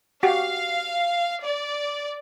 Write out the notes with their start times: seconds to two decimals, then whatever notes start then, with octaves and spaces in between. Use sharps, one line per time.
0.23 F#4 G4 F5 F#5
1.43 D5